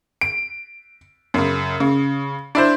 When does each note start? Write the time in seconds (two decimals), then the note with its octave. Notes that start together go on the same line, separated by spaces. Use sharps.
0.21 D7
1.34 F#2 C#3
1.80 C#3
2.55 D4 E4 C5